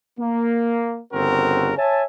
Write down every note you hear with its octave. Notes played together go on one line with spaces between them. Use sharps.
A#3
G1 C#3 C4 F#4 A#4
C#5 E5 G#5 A5